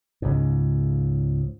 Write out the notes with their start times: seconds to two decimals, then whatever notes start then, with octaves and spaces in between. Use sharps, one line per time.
0.22 C#2 G#2